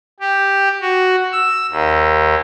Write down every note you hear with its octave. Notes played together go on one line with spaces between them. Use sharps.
G4
F#4
E6
D#2